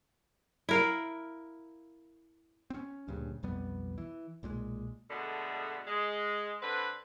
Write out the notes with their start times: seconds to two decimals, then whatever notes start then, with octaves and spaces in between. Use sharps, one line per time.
0.69 E4 A#4 F5
2.70 C4 C#4
3.08 D2 G2 A#2 C#3
3.43 B1 F2 G3 B3
3.98 E3
4.43 B1 A#2 D3 G#3
5.09 B2 D3 G#3 A3 B3
5.87 G#3
6.61 D3 C4 B4